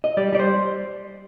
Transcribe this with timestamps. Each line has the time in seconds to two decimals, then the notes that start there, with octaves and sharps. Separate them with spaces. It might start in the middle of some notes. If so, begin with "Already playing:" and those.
0.04 D#5
0.17 G3 D5
0.33 G3 D5
0.39 C5